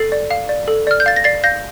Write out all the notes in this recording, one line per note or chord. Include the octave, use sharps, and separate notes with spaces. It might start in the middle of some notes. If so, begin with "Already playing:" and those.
Already playing: A4 A6 C7
D5
F5
D5
A4
D5 F6
G6
F5 A6
A#6
D5 A6 C7
F5 G6 A#6